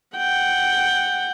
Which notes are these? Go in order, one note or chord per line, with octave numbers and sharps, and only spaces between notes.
F#5 G5